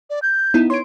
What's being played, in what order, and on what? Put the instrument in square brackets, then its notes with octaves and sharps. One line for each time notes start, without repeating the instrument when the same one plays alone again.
[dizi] D5
G6
[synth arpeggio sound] B3 D#4 E4
[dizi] C#5 [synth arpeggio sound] C6 D7